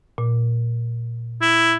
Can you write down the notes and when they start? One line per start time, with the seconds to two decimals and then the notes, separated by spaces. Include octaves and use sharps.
0.18 A#2
1.42 E4